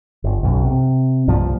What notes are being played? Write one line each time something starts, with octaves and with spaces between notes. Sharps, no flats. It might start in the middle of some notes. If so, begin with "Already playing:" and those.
G1
B1 F#2
C3
C2 G2 A#2 F3